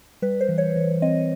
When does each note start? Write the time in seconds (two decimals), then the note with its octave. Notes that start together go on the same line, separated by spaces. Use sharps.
0.22 G3 B4
0.41 C5
0.49 E3
0.58 C#5
0.76 E3
1.02 C4 D#5